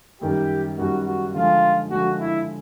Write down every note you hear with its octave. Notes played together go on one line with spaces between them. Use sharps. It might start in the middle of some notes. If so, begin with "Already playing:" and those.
F#2 D#3 G3 G4
F#2 D#3 G3 F#4
F#4
D3 F3 G#3 F4
D3 F3 G#3 F#4
E4